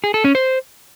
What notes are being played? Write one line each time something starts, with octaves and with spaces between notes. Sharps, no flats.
G#4
A4
C#4
C5